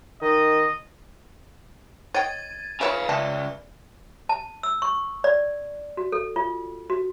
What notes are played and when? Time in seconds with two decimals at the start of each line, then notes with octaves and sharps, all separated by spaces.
0.22 D#3 D#5
2.14 C#5 D#5 G5 G#6 A6 D#7
2.81 F4 B4 C#5 E5 F5 G#5 B5
3.09 C#2 D5 E5 A5
4.29 A5
4.63 E6
4.82 C#6
5.24 D5
5.97 F#4
6.12 A4
6.36 F4
6.90 F#4